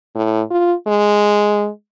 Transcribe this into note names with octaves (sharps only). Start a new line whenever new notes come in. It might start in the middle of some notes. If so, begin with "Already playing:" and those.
A2
F4
G#3